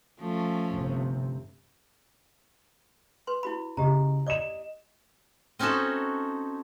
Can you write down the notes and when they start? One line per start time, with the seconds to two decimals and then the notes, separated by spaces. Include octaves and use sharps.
0.19 F3 A3 C#4
0.73 G1 C3
3.27 B4 C6
3.43 E4 F#4 B5
3.77 C#3 G4 D#5 A#5
4.27 D5 D#5 D6 E7
5.59 C4 C#4 D#4 F#4 A4